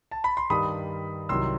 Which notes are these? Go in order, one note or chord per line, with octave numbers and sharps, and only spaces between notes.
A5
B5
C6
G2 D#3 G3 B5 D#6
C2 C3 D#3 F#3 C6 E6